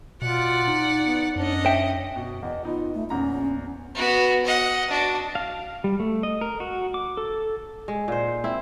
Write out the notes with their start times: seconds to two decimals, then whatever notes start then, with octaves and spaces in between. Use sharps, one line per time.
0.22 B2 F4 D5 F#5
0.68 D#4
1.03 B3
1.36 F#2 C#4 D4 D#5
1.66 E5 G5
2.16 B2
2.43 E2 D#5
2.65 B3 D#4 F4
2.95 A3
3.10 A#1 E2 C#4 A#5
3.95 B3 F#4
4.45 D#5 F#5
4.90 D4 F#4
5.35 F5
5.84 G3
6.00 A3
6.23 D#5
6.41 A#4
6.60 F#4
6.94 D6
7.17 A4
7.88 G#3
8.08 A#2 C5
8.44 C4 E4